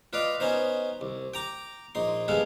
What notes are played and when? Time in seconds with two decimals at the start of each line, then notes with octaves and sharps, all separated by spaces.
0.13 F4 B4 D5 D#5 F5
0.40 B3 C#4 D#4 C5
1.01 C2
1.34 G5 A#5 D6
1.95 A#1 D#4 C6
2.28 G2 G#3 B3 A4 F5